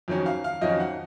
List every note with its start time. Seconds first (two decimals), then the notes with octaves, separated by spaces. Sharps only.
0.08 F2 D#3 F#3 C#4
0.26 F5
0.44 F5
0.61 F2 D#3 F#3 C#4 D#5
0.80 F#5